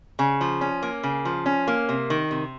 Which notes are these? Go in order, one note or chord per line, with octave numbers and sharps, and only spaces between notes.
C#3
F3
C#4
A#3
C#3
F3
C#4
A#3
C3
D#3
C3